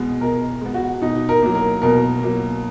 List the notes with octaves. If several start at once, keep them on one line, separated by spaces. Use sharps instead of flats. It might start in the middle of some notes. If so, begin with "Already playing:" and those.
Already playing: B2 G#3 B3
B2 A#4
G#3 B3
F#4
B2 D#4
A#4
F#3 A#3
A#4
B2 A#4
F#3 A#3